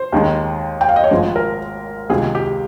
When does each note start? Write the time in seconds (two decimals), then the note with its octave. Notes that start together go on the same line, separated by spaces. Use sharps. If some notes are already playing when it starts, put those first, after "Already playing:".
Already playing: C5
0.12 D#2 D#3 G#3
0.81 G5
0.89 F5
0.96 D#5
1.04 C#5
1.11 G#1 G#2 F3 G#3 C5
1.36 A#4
2.10 C#2 C3 D#3 G#3 G#4
2.35 G4